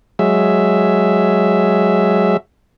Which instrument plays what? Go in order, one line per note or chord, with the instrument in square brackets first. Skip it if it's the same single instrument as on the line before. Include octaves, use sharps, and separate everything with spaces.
[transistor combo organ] F#3 G#3 E5